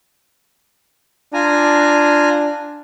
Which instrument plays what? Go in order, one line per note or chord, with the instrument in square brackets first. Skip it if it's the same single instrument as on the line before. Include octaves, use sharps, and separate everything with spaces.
[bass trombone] D4 [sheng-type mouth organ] F4 G#5 A#5